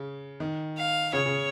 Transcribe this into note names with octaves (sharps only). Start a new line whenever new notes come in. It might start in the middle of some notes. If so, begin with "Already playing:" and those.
Already playing: C#3
D#3
F5
C#3 C#5
C#3